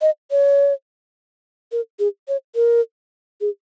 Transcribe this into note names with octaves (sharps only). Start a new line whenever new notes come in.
D#5
C#5
A#4
G#4
C#5
A#4
G#4